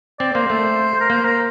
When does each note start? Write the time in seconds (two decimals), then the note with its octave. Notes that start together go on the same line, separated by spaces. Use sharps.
0.19 C4 D5
0.34 A#3 C5
0.50 A3
1.01 A#4
1.10 A#3 C5
1.25 A#4